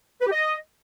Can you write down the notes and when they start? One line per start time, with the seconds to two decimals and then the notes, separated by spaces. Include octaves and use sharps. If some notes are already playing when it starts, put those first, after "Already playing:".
0.21 B4
0.26 G4
0.32 D#5